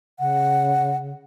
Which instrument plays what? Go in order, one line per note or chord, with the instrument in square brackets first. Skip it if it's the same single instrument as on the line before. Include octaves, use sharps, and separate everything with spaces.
[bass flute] C#3 [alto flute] F#5